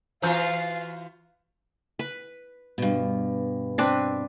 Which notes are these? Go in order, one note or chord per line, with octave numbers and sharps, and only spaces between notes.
E3 F4 F#4 C5 F5 A#5 G6
B4
G2 B2
C4 D4 B4